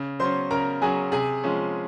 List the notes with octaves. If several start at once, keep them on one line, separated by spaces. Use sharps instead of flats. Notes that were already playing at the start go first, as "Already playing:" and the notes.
Already playing: C#3
F#3 C#4 C5 C6
C#3 A#4 A#5
F#3 C#4 G#4 G#5
C3 G#4 G#5
F3 G#3 C#4